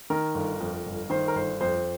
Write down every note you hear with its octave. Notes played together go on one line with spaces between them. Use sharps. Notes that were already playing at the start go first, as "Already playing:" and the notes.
D#3 A#4
G1
F2
G1
D#3 C5
A#4
G1 C5
F2 C5